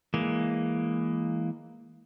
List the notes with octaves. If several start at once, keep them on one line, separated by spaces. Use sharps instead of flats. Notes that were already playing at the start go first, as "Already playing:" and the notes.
E3 G#3 A#3